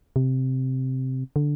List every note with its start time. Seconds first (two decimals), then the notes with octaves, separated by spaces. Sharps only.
0.16 C3
1.36 D3